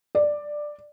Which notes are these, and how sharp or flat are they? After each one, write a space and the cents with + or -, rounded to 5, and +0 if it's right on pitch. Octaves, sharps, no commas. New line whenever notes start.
D5 +10